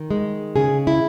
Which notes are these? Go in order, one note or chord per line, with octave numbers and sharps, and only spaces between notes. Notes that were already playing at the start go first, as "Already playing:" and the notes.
Already playing: D#3
G#3
C#3 G#4
E4